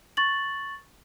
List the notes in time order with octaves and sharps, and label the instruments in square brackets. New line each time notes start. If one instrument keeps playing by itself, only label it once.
[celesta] C#6 A6 F#7